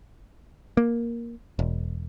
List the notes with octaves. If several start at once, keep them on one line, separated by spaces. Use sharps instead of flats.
A#3
E1